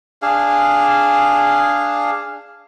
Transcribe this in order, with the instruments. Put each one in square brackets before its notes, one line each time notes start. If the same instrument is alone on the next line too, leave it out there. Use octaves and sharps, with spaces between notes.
[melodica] D4 G#4 F5